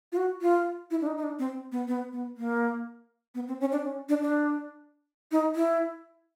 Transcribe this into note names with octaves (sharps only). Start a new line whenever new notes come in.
F4
F#4
F4
E4
D4
D#4
D#4
D4
C4
B3
B3
B3
A#3
B3
C4
C#4
D4
C#4
D4
D4
D#4
E4